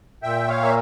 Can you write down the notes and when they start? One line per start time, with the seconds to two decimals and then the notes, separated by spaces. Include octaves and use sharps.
0.23 A#2 E5 G5
0.48 C#5 F5
0.62 A#3 E5